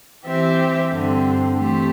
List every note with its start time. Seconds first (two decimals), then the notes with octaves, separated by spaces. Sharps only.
0.25 E3 C4 G4 E5
0.91 G2 D3 C4
1.56 E3 A3 C4 G4